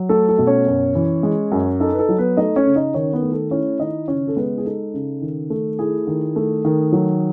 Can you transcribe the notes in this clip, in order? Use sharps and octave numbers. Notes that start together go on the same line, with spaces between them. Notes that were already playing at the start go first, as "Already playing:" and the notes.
Already playing: F#3
A3 A4
A4
B2
C#4 C#5
F#2
E3
G#3
F#2
D#4 A4
B4
A4
F#3
B3 B4
A3 D#4 D#5
C#4 C#5
C#3
D#4 D#5
D#3 C#4 C#5
B3 B4
A3
A4
C#4 E4 C#5
D#3 D#4 D#5
C#3 C#4 C#5
A4
G#3 B3 B4
G#4
D#4 A4
C#3
D#3
A3
E4 G#4
D#3
A3
D#3
F#3